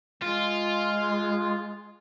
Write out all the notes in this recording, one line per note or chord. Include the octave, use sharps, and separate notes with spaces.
G#3 F4